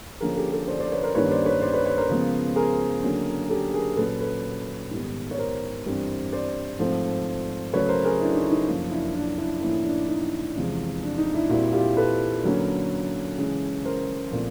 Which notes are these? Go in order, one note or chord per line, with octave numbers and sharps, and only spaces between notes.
D3 F3 A#3 C#4 G#4 A#4
G4 A4
G4 A4
C5 D5
C5 D5
B4 C#5
A#4 C5
G2 D#3 G3 A#3 C#4 B4 C#5
C5 D5
B4 C#5
C5 D5
B4 C#5
B4 C#5
A#4 C5
C#3 F3 G#3 B3
G#4 A#4
D3 F#3 A#3 C#4
G4 A4
G#4 A#4
A#2 F#3 A#3 C#4 A4 B4
A4 B4
G#2 D#3 G3 B3
C#5
A#4 C5
G2 E3 G3 C4
C5 D5
G#2 F3 A3 C4
C#3 F#3 A3 B4 C#5
A#4 C5
G#4 A#4
D4 E4
D#4
D#4
F#2 C#3 F3 A#3
D4 E4
D4 E4
D4 E4
A2 F3 A#3 C#4 D4 E4
D4
D#4
E2 C3 F3 G#3
D4
D#4
D4 E4
A#2 G3 C4 E4 F#4
F4 G4
A4 B4
D3 F#3 A#3 C#4
C#3 E3 G#3 C#4
A#4 C5
A#2 F3 A3 C4